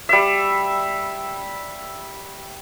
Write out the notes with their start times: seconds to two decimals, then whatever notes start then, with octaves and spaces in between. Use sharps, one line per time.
0.09 G3 E5